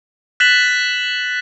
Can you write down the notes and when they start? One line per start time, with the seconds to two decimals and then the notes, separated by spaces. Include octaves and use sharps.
0.40 F#6 A6 B6 E7 F#7